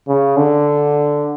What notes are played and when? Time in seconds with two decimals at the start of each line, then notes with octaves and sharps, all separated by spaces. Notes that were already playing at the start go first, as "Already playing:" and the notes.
0.08 C#3
0.37 D3